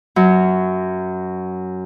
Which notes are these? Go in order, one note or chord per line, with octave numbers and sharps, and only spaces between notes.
F#2 F#3